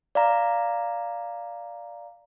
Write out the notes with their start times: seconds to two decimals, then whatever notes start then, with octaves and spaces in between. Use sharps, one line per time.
0.15 D5 F5 A#5